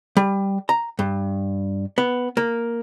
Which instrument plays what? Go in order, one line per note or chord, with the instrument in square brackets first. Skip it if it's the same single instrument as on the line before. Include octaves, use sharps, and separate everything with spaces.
[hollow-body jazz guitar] G3
A#5
G2
B3
A#3